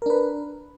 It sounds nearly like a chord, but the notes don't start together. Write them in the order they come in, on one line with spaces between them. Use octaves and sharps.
A#4 D4 B4